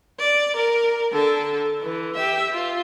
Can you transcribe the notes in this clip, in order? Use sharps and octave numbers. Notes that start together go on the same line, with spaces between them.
D5
A#4
D3 A4
E3
G4 E5
F4